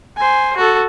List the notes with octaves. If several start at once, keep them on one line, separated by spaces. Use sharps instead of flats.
C5 G#5
F#4 A4